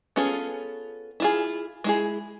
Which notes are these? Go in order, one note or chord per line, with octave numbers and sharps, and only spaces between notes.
B3 C#4 F4 G#4 A4
E4 F4 G#4
G#3 E4 G#4